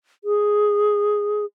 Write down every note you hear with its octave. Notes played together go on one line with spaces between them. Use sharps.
G#4